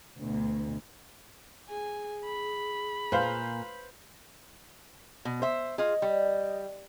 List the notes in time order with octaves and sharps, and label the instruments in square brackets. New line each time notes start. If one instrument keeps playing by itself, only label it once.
[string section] D2 B2
[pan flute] G#4 [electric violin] G#5
[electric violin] B5
[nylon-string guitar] A#2 [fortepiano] B4 C5 F5
[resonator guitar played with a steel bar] B2
C5 E5
[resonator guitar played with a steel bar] F4 G#4 [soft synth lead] D#5
[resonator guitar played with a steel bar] G3